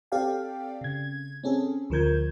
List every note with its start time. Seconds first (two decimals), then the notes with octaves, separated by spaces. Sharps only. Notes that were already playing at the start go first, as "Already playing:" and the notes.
0.12 C4 G4 A4 D5 F5 G5
0.81 C#3 G#6
1.44 C4 C#4 G#4 A4
1.90 D2 F3 A#4 G6 G#6